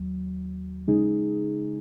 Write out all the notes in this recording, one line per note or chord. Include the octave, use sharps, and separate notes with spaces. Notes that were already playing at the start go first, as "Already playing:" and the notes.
Already playing: D#2 F#3
C#3 G#3 D#4 G#4